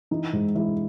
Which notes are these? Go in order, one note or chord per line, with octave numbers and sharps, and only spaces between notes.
E3 D#4
G#2
E3 E4